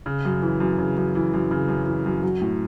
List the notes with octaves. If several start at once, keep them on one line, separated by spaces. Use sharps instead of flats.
C#3
F#2
E3
F#2
C#3
F#2
E3
F#2
C#3
F#2
E3
F#2
F#3
A2